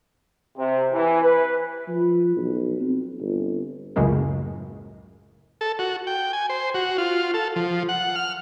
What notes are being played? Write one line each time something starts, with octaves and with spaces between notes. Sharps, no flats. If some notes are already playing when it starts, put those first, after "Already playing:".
C3
E3
B4
F3
B1
C4
G1
C#2 F#2 A2 C#3 G#3 A#3
A4
F#4
G5
G#5
C5
F#4
F4
A4
F3
F#5
F6